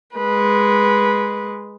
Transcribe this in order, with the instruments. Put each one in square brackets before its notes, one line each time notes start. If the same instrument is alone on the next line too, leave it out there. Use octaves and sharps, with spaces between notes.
[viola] G#3 B4